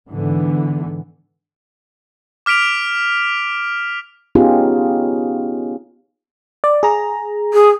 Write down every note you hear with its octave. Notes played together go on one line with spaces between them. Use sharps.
G#2 D3 E3 B3
D6 F6 B6 D7 F7
B3 C#4 D#4 F4 G4 G#4
D5
G#4 A#5
G#4